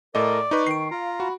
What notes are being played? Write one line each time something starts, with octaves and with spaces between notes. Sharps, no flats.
A2 A4 A#4 D5 D#5
D#4 B4 C#6
D#3 C7 D7
F4 F5 A#5
F#4 B5